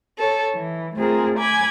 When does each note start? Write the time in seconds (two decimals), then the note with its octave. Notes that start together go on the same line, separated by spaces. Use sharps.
0.19 A4 C#5
0.54 E3
0.97 A3 C4 F4 G#4 A#4
1.38 G#5 B5 D6 G#6